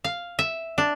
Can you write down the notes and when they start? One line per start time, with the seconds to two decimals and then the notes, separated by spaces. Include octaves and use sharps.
0.04 F5
0.39 E5
0.78 D4